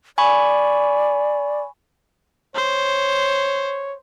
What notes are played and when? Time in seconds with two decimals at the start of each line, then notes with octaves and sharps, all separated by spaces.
0.18 D5 G#5 B5 C#6
2.56 C5 C#5